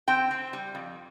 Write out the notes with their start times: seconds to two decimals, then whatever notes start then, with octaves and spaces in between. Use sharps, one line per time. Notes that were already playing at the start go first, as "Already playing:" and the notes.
0.08 C4 G5
0.31 C4
0.53 G3
0.75 F2